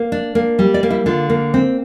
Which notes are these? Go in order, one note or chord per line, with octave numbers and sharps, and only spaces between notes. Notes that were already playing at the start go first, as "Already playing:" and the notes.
Already playing: A#3
D4
A#3
G3
D5
A#3
E4
D3 F4
A#3
C4